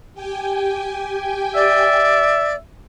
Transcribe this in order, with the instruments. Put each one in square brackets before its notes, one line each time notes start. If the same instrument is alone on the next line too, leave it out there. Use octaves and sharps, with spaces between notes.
[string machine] G4 G5 G#5
[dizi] D5 [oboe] E5